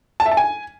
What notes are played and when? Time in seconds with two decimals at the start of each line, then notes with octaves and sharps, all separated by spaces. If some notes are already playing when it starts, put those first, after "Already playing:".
0.20 A5
0.26 E5
0.31 A5
0.37 G#5